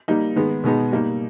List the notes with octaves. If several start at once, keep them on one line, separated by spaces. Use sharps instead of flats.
G3 A#3 D#4
D#3 G#3 B3
B2 G#3 B3 D#4
G3 A#3 D#4